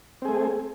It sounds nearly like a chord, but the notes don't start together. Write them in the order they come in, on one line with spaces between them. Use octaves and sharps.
C4 G#4 A3